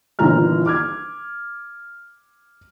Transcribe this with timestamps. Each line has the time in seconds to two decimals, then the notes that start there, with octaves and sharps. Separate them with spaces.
0.19 G1 A#2 D#3 E3 A#5 F6
0.66 D6 F6 G#6